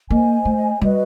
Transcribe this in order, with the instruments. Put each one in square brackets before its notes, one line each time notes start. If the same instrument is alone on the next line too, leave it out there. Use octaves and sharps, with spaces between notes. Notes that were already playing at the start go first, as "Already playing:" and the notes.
[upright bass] A#3 [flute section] C5 D#5 G#5
[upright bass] A3
[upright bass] G3 [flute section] F#4 B4 D#5